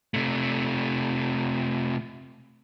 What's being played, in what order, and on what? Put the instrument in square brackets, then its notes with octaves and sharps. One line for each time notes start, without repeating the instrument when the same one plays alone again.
[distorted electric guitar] C3 A3